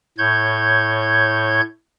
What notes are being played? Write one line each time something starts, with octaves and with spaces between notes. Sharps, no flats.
A2 C#5 G6 G#6